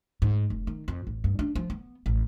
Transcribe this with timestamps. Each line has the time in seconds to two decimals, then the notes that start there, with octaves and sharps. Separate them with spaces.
0.22 G#2
0.50 F1
0.67 D#3
0.88 F2
1.07 A1
1.24 G2
1.39 D4
1.55 F3
1.70 B3
2.06 A1